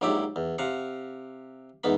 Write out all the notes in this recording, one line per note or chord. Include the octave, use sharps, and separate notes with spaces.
A#1 G#2 F#3 E4 G4 D5
E2
C3 F5 F#5
E2 G#2 B3 B5